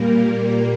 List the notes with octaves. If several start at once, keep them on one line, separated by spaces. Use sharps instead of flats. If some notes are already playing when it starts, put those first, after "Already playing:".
Already playing: A#2 G3 A#3 A#4